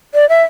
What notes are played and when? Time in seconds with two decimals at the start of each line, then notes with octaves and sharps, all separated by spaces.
0.14 D5
0.29 E5